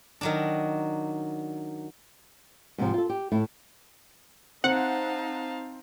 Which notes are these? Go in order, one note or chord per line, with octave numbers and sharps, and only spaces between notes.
D#3 F#3 D4
G#2 C3 F3
F4 A4
G4
A2 A3 E4
C4 D#4 F5 F#5 A5